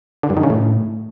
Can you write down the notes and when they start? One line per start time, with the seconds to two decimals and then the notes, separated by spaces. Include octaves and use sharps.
0.23 D3
0.30 G2
0.37 D#3
0.43 C#3
0.50 A2